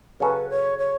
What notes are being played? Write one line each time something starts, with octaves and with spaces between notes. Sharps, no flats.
C#3 F#3 C#4 A4 B4
C#5
C#5